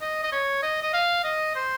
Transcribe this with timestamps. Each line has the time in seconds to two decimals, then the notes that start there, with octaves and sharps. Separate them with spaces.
0.01 D#5
0.23 D#5
0.32 C#5
0.62 D#5
0.83 D#5
0.93 F5
1.24 D#5
1.55 C5